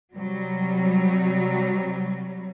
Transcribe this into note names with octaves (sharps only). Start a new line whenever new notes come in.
C3 F#3 G3